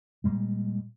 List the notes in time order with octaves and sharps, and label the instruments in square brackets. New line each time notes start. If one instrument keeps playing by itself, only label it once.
[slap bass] A#2 G3 G#3